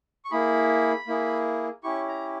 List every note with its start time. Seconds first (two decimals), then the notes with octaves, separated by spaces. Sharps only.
0.25 C#6
0.31 A#3 E4 G#4 B5
1.07 A#3 E4 G#4
1.83 C#4 E4 G4 C#6
2.08 A#5